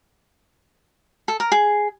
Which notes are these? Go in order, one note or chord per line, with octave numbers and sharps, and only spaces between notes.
A4
A#4
G#4